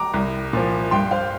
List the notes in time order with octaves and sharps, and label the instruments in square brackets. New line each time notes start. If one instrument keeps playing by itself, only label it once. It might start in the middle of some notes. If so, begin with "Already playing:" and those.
Already playing: [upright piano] A#5 D6
C2
A#2 F3
G2 G5 C6
C5 F5